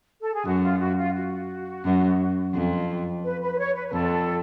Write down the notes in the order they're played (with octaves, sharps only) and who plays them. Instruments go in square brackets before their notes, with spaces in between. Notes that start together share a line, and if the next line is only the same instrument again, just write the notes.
[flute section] A4
G#4
[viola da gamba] F#2 [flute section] F#4
[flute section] F4
F#4
F4
F#4
[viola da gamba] F#2
F2
[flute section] B4
B4
B4
C#5
B4
B4
[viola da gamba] F2 [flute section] A4